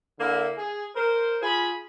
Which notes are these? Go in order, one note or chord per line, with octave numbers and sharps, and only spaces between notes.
D3 A#3 E4
G#4
A#4 C5
F4 G#4 G#5 B5